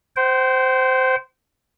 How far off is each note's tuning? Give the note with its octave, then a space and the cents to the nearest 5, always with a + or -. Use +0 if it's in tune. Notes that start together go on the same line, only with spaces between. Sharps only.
C5 -10 G5 -45